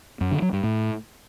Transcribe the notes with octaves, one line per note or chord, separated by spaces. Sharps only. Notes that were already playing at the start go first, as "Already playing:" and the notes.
F#2
D3
F#3
G2
A2